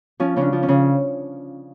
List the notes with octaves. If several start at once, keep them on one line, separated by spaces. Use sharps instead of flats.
F3 C#4
C#3 C#4 D4
F3
C#4
C#3